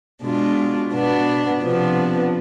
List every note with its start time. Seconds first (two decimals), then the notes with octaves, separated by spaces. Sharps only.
0.22 B2 G#3 D4 F4
0.92 B2 B3 D4
1.63 C3 F3 B3 D4